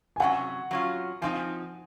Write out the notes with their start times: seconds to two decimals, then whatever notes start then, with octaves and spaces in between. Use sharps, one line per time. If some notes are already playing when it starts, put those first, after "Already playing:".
0.16 G#5
0.20 C3 F#3 C#4 F#5
0.71 F#3 C#4 F4
1.22 F3 C4 D#4 G#5